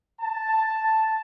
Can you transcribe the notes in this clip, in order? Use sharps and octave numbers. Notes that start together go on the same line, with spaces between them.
A5